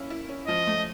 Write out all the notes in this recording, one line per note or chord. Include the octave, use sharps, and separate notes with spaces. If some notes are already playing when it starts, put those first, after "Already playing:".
Already playing: A#3 C#4 E4
E4
C#4
F3 D#5
A3